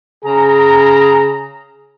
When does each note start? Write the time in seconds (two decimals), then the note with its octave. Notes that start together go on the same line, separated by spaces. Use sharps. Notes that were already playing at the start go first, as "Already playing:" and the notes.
0.24 C#3 G#4 A#5